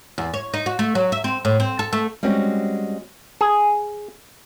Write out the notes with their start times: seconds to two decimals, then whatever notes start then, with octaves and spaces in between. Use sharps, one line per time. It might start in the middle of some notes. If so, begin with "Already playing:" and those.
0.18 E2
0.34 C#5
0.54 D#4
0.66 F#4
0.79 A3
0.95 F#3
1.12 E5
1.24 C4
1.45 A2
1.60 C4
1.79 A4
1.93 A3
2.23 G3 G#3 C4 C#4 F#4
3.41 G#4